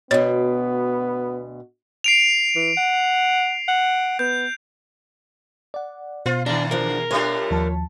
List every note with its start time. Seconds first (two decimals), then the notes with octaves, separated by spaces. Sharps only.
0.11 D2 B2 B3 C#5
2.04 C7 D7 F7
2.56 E3
2.77 F#5
3.68 F#5
4.19 B3 G6
5.74 D5 F#5
6.26 B2 F4 C5 C7
6.46 E2 D#3 D4 A#5
6.71 F3 D4 A#4
7.11 G3 A3 D4 F4 C#5
7.51 D#2 F3 A5